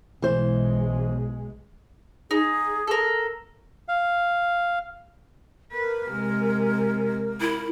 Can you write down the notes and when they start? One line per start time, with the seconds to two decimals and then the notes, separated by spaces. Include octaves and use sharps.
0.22 B1 B2 E3 G#3 C5
2.31 D#4 G#4
2.87 A4 A#4
3.88 F5
5.71 A#4 B4
6.08 C3 G#3
7.41 E4